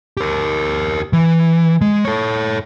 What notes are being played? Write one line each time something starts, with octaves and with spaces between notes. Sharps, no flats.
G4 A#4
E3
G#3
A4 C#5